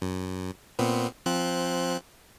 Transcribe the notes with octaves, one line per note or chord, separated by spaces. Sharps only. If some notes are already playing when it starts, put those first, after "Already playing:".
F#2
A#2 B3 C4
F3 C4 F#6